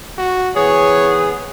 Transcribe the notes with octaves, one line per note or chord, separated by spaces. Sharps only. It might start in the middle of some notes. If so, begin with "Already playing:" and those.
F#4
E3 B3 G#4 C#5